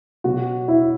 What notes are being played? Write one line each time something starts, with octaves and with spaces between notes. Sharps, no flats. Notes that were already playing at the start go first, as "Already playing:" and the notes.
B2 F#3 C#4 F#4
E4